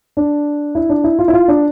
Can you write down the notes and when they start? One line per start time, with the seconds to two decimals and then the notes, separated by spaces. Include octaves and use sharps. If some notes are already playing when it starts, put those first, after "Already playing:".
0.17 D4
0.75 E4
0.89 D4
1.04 E4
1.19 F4
1.28 E4
1.34 F4
1.48 D4